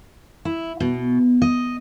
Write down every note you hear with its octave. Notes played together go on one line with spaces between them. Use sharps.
E4
B2
D#5